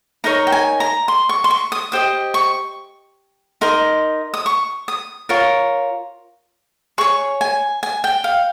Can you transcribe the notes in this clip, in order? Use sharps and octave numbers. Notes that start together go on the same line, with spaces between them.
D#4 A#4 C#5 A#5
G5
G#5
A#5
C6
C#6
C6
C#6
D#6
G4 C5 D#5 D#6
C#6
D#4 A#4 D#5 C6
D#6
C#6
D#6
F4 A#4 C#5
G#4 C#5 C#6
G#5
G#5
G5
F5